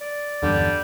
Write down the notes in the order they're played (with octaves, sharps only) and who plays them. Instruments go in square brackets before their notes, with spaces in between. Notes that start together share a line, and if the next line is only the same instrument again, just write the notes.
[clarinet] D5
[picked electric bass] E2 G2 [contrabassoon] D3 [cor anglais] G3